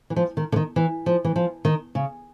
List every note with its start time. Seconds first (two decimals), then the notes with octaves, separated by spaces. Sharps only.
0.10 E3
0.16 F3
0.37 D#3
0.52 D3
0.56 D#3
0.76 E3
1.06 F3
1.25 E3
1.36 F3
1.65 D#3
1.95 C#3